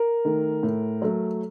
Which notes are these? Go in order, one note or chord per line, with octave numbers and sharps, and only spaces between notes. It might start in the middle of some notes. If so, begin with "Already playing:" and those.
Already playing: A#4
D#3 A3
A2
F#3 A3